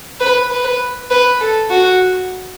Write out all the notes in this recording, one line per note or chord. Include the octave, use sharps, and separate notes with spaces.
B4
B4
B4
A4
F#4